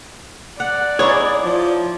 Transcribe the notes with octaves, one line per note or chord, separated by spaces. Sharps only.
D5 F#5
D#4 E4 G#4 C#5
F3